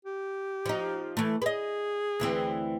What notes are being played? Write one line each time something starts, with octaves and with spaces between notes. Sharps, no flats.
G4
F3 D#4
E3 A3
G#4 B4 D#5
D2 E3 C4